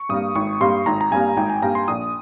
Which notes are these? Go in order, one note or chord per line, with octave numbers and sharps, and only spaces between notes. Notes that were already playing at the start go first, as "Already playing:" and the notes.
Already playing: C#6
G2 G3 A#3 D#6
G#1 C#6
G2 G3 A#3 C6
G#1 A#5
A#5
G2 G3 A#3 G#5
G#1 G5
G#5
G2 G3 A#3 A#5
C6
A#1 D#6